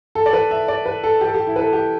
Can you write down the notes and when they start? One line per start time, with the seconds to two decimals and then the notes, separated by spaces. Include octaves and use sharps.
0.15 A4
0.26 D5
0.33 B4
0.51 E5
0.68 D5
0.86 B4
1.04 A4
1.21 G4
1.28 A4
1.34 G4
1.47 E4
1.56 B4
1.61 A4
1.73 G4